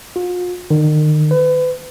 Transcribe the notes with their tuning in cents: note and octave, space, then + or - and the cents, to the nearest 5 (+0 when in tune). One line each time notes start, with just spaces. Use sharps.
F4 +40
D#3 -35
B4 +35